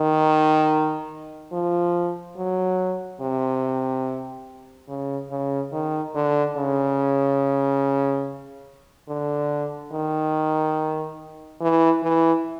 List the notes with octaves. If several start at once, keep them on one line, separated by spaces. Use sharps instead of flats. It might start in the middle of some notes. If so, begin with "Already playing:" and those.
Already playing: D#3
F3
F#3
C3
C#3
C#3
D#3
D3
C#3
D3
D#3
E3
E3